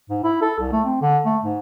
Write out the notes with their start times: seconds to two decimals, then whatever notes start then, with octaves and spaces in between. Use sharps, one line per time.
0.09 G#2
0.23 E4
0.42 A4
0.59 C2
0.72 A3
0.84 C4
1.01 D3
1.25 A3
1.43 G#2